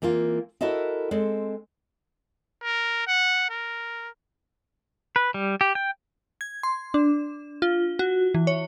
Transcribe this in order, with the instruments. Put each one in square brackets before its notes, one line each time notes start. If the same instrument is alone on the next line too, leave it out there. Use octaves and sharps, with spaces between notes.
[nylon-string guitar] E3 A#3 C4 F4
E4 F#4 A4 A#4 D#5 E5
G#3 C4 A4
[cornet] A#4
F#5
A#4
[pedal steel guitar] B4
G3
G4
G5
[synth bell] G#6
C6
D4
F4
F#4
E3
C#5